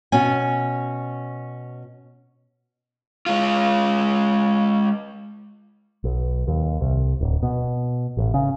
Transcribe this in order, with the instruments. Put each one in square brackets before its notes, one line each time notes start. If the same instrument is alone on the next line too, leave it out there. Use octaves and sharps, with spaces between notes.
[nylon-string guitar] B2 C#4 G#5
[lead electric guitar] G#3 F4
[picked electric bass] B1
D#2
C2
D1
B2
A1
C#3